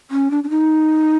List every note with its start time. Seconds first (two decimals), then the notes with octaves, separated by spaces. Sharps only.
0.11 C#4
0.31 D4
0.44 D4
0.50 D#4